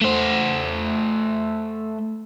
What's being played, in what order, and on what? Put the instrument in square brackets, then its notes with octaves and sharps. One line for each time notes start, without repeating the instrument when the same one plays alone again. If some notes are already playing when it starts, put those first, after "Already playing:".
[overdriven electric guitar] A3 C5